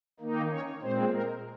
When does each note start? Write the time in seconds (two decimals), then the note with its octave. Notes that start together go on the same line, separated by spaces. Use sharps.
0.20 D#3 A#3 D#4
0.50 C#4 C#5
0.82 A#2 G#3 C4 C5
1.13 A#4